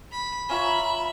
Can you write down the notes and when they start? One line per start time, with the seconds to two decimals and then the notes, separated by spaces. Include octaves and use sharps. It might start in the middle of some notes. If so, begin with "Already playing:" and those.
0.11 B5
0.49 C#4 F4 E5 A#5 B5